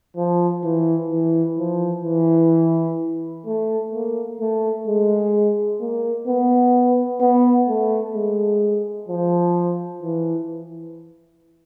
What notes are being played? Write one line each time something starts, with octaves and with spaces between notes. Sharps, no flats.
F3
E3
E3
F3
E3
A3
A#3
A3
G#3
A#3
B3
B3
A3
G#3
F3
E3